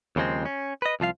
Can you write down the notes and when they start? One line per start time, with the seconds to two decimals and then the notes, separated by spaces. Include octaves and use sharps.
0.16 D#2 C#3 F3 G#3 C4
0.45 C#4
0.82 B4 D#5
1.00 C2 F3 F4 F5